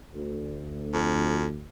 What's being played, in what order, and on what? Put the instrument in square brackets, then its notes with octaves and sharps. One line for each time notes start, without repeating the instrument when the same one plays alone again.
[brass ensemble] D2
[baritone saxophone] F2